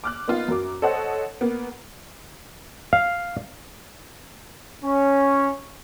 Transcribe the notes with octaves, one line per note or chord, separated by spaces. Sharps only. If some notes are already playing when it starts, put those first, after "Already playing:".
D6 F6 F#6
A#3 B3 D#4 F4
F#2 F#3 A#4 D6
A4 C5 C#5 D#5 F#5
A#3 B3
F5
C#4